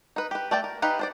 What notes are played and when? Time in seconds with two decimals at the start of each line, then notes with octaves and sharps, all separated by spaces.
0.16 D#4 B4
0.31 G4 B4
0.51 A3 D5 G5 A5
0.64 A#4
0.82 D#4 G4 B4 F5
0.99 D4 C5 D5